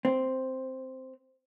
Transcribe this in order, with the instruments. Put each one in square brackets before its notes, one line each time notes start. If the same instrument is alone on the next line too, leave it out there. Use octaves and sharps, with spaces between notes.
[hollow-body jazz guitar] C4